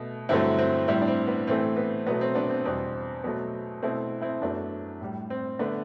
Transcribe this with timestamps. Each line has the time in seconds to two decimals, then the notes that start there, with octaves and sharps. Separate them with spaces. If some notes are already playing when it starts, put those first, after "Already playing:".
Already playing: B2 A3
0.29 G2 D3 F#3 A3 C4 E4
0.59 C4
0.88 A2 G3 C4 E4
1.01 D4
1.08 C4
1.27 B3
1.47 A2 E3 A3 C4
1.77 B3
2.06 B2 F#3 A3 B3
2.21 C4
2.35 B3 D4
2.50 C4
2.65 E2 B2 G3 C4
3.24 B2 F#3 A3
3.83 B2 A3 C4 E4
4.22 C4 E4
4.42 F#2 F#3 A3 B3 D4
5.01 A2 G3
5.30 C4
5.59 D3 A3 B3 D4